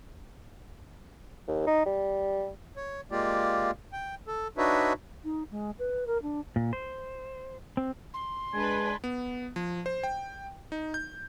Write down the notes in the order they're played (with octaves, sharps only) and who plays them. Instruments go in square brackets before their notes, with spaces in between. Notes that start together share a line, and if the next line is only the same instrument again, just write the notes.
[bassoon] D#2
D#4
G3
[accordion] C#5
G#3 A#3 F4 G4 D5
G5
A4
D4 D#4 F#4 B4 C#5 E5
[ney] D#4
G#3
B4
A#4
D4
[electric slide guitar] A#2
C5
C4
[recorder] C6
[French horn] G#3 [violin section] D4 B4 [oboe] G#5
[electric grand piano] B3
F3
C5
G5
D#4
G6